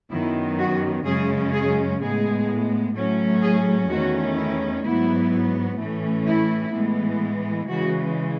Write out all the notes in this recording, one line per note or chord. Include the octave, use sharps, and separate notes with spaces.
F#2 D#3 F#3 B3 E4
F#4
F#2 C#3 G#3 C#4 G#4
G#4
A2 G#3 B3 G#4
A2 F#3 A3 C#4
G#4
E2 D#3 A3 C#4 F#4
E4
G#2 F#3 B3 E4
A2 E3 A3 C#4
E4
A2 E3 G#3 B3
C#3 E3 G#3 F#4